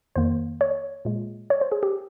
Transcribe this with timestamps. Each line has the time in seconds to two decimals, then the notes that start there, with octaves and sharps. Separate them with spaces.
0.16 F2 D#3 A#3 C5
0.61 C#5
1.05 A#2 G#3
1.50 C#5
1.61 C5
1.72 G#4
1.83 G4